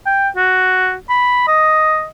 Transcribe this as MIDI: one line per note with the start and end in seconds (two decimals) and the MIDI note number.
0.06 0.29 79
0.36 0.95 66
1.09 1.44 83
1.47 2.06 75